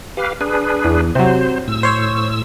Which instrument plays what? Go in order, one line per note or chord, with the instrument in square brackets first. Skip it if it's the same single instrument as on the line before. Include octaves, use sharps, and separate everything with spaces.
[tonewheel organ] G4 B4 F5
D4 G#4 B4
[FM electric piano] E2
[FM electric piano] C3 F#3 [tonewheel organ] C5
[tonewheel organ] A2 E6
[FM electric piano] C5 C#5